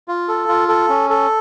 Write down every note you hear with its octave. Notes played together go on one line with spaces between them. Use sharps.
F4
A4
F4
A4
C#4
A4